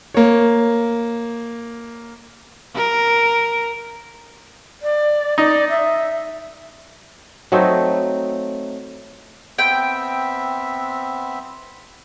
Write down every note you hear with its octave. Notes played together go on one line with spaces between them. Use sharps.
A#3 C#5
A#4
D5
D#4 D5
E5
F#3 A3 C4 D#4
B3 C4 E5 G5